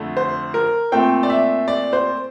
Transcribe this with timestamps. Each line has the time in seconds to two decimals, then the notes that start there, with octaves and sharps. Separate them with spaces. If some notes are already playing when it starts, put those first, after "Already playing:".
Already playing: F2 D3 A3
0.17 C5
0.54 A#4
0.92 A#2 A3 C4 G5
1.23 D5
1.30 E5
1.68 D5
1.93 C5